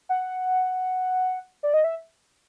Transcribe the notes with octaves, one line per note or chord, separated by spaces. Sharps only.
F#5
D5
D#5
E5